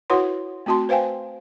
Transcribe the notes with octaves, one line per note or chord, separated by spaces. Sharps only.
E4 F#4 B4 C#5 F#5 C6
A3 C4 F#4 A5 C6
B4 C5 F5 G5 G#5